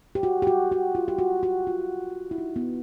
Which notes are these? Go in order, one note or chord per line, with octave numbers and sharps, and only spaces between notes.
G4
F#4
G4
F#4
F#4
F4
G4
F#4
F#4
F4
E4
D#4
B3